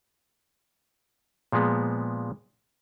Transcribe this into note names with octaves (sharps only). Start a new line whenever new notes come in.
A#2 F3 G#3 B3